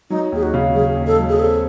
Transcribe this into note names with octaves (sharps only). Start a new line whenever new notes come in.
F#3 D#4
D#2 G#4
F#4
C#3
F#3 G#4
D#2
A4
F#3
G#4
C4 A4